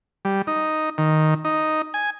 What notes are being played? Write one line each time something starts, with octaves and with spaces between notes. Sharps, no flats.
G3
D#4
D#3
D#4
G#5